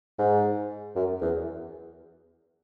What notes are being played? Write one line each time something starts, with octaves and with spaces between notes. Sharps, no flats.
G#2
F#2
E2